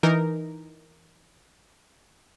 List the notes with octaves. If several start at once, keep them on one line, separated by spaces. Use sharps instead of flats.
E3 D#4 A#4